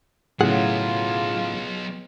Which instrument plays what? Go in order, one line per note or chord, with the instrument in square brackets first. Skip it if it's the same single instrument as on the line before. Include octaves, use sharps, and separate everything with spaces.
[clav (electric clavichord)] A2 C#3 [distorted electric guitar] F#3 B3 [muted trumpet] F4 [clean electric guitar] G#4 F#5